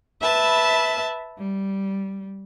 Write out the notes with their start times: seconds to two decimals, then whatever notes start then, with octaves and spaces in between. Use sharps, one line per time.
0.22 B4 E5 A5 B5
1.37 G3